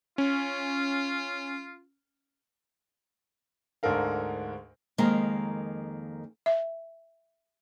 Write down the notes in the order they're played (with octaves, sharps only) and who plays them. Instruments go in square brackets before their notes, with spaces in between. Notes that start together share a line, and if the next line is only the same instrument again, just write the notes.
[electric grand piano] C#4 [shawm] F4
[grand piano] D2 G#2 D4 A4 A#4 F5
[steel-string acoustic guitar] F2 D#3 G#3 A#3 D#5 A#5
[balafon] E5